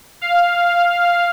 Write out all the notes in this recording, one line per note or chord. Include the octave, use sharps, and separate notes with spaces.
F5